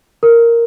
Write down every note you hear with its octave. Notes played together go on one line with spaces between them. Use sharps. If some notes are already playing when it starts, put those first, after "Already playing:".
A#4